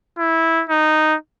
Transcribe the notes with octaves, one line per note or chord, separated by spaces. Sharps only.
E4
D#4